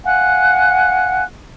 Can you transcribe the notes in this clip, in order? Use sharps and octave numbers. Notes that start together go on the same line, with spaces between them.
F5 F#5 G#5 F#6